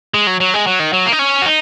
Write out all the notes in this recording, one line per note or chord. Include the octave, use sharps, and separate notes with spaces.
G#3
F#3
F#3
G#3
F#3
D#3
F#3
A#3
D#4
C#4
F#4
D#4